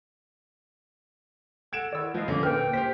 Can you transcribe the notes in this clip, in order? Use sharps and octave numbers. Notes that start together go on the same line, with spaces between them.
A4 F#5 G#6 D7 E7
D#3 E4 D5 E6
F3 B4 D#5 F5
D3 A#3 C#4
A#2 A#4 B4 G5 F6
G4 C5 B6